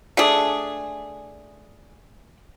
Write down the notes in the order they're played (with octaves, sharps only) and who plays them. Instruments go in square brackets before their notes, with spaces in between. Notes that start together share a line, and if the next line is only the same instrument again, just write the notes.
[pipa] A3 D4 G#4